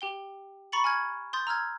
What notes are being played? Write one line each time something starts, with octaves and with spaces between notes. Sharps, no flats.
G4 G5 G7
A#5 B5 C#6 A6 C#7 F#7
G#5 F6 G#6
C6 D#6 G6 A6
A#5 E6 F6 G#6